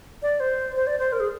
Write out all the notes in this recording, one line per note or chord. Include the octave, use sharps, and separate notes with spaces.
D5
C5
C5
D5
C5
A#4
G#4